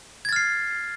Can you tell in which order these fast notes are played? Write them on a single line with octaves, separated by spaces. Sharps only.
G#6 A6 F6 C7